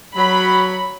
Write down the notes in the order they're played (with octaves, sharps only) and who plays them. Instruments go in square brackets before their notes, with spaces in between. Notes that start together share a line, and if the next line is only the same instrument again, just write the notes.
[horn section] F#3 [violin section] B5